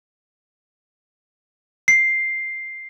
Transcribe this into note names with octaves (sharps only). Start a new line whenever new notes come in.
C7